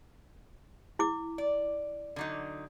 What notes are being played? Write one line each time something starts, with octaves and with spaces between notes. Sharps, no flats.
E4 D6
D5
D3 F#3 D#4